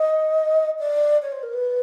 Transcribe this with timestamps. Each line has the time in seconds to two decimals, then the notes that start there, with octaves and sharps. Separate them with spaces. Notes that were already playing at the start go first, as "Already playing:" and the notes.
Already playing: D#5
0.79 D5
1.21 C#5
1.32 C5
1.42 A#4
1.53 B4